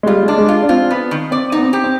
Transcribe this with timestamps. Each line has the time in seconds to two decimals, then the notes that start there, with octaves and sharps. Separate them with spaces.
0.03 G#3
0.06 G3 F4
0.23 G#3
0.28 D4
0.37 G#3
0.48 F4
0.62 D4
0.69 C4 F4
0.91 B3
1.11 D#3
1.31 C4 D5
1.52 B3 D#4
1.63 C4
1.73 G4
1.84 C4